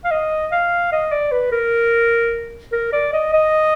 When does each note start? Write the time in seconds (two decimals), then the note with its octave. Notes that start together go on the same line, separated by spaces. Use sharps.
0.05 F5
0.11 D#5
0.52 F5
0.92 D#5
1.12 D5
1.32 B4
1.52 A#4
2.72 A#4
2.93 D5
3.13 D#5
3.34 D#5